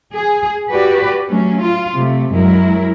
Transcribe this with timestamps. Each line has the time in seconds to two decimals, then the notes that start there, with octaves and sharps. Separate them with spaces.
0.14 G#4
0.70 F#4 G4 B4 D5
1.29 F#3 A3 C#4
1.61 F4
1.94 C3 A3
2.33 F#2 F#3 G#3 E4 A#4